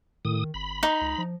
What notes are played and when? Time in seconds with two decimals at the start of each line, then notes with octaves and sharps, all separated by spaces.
0.25 A2 D#3 D#6
0.54 G1 B5
0.83 D#4
1.01 C#2
1.18 F3